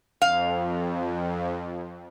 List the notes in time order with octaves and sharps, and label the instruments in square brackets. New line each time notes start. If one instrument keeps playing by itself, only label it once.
[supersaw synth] F2 [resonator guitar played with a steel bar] F5